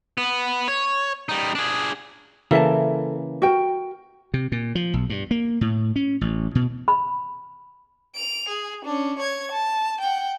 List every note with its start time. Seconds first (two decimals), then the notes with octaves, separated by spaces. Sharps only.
0.18 B3
0.68 C#5
1.29 G3 D#4
1.55 D4 G#4
2.51 C#3 E3 A#3 A4 E5 A5
3.42 F#4 A#4 G5
4.34 C3
4.52 A#2
4.75 F3
4.94 B1
5.10 G2
5.31 A#3
5.61 A2
5.96 C#4
6.21 A1
6.55 B2
6.88 B5
8.15 D7 F7
8.49 G#4
8.85 C#4 D4
9.19 C#5 G#6
9.52 A5
10.01 F#5 G5